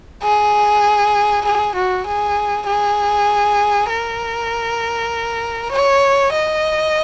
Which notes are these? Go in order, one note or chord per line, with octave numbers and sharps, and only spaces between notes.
G#4
G#4
F#4
G#4
G#4
A#4
C#5
D#5